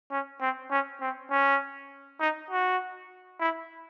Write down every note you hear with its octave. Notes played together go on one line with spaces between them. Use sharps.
C#4
C4
C#4
C4
C#4
D#4
F#4
E4